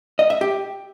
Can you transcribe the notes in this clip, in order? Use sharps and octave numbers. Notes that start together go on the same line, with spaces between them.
D#5
E5
G4